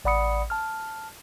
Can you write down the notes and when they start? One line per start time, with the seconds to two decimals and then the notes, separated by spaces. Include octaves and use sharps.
0.05 A1 D5 F#5 B5 D#6 C#7
0.50 A5 F6